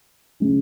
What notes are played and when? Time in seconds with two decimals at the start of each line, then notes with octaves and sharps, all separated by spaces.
0.40 C#3 G#3 C#4